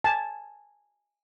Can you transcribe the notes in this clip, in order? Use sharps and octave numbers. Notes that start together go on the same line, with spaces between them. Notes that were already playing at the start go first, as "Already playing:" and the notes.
G#5 A5